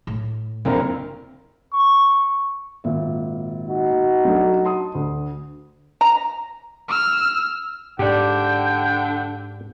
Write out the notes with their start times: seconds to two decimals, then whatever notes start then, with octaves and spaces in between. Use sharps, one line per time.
0.07 A2
0.65 F#1 F2 D3 C4 A#4
1.73 C#6
2.84 G#1 A#2 E5
3.69 D#4 F#4
4.25 F#3 A3 D4
4.64 A5 C6 D#6
4.95 D2
6.01 A#5
6.89 E6 F6
7.99 G#2 D3 G4 D5 G5